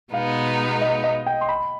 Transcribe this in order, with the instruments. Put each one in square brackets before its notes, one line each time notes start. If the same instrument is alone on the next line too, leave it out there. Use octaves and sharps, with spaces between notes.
[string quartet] B2 G#3 B3 D#4 [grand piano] F5
[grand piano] D#5
D#5
G5
C6
B5